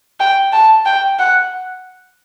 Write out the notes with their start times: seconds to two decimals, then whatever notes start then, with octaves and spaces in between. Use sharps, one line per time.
0.20 G5
0.53 A5
0.86 G5
1.19 F#5